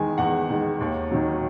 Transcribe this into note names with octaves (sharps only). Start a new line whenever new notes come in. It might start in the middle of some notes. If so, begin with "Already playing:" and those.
Already playing: E2 D#3 G#3 G#5
E2 F#5
D#3 G#3
D#2
D#3 F#3